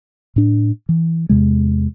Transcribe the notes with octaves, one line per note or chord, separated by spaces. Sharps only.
A2 D4
E3
E2 C3 G#3